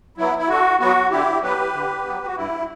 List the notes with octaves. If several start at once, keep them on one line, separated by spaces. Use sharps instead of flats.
F#3 B3 E4
E4
D3 F#4
F#3 B3 F#4
D3 E4 G4
F#3 B3 G4 B4
D3
F#3 B3
F#4
G2 E4